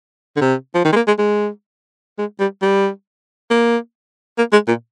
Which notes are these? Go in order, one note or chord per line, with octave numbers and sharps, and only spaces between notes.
D3
C3
F3
D#3
G#3
A#3
G#3
G#3
G#3
G3
G3
A#3
A#3
G#3
A#2